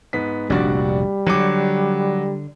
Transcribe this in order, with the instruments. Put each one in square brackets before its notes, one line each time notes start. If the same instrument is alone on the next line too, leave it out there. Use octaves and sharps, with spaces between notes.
[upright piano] G#2 B3 B6
[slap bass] F1 A#1 [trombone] G3 [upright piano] D4 F#4 D5
[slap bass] D3 [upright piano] F#3 D6